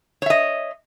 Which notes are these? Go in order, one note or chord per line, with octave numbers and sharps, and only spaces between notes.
C#5 D#5 E5